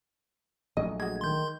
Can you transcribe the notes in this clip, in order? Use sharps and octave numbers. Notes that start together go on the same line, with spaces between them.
A#1 F#3 A3 D#5
G#3 F#4 G#6
D#3 C6 G6